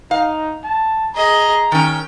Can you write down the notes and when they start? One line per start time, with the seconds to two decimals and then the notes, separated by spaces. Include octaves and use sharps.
0.11 D#4 F5
0.64 A5
1.15 G#4 D#5 A#5
1.72 D#3 C#4 G5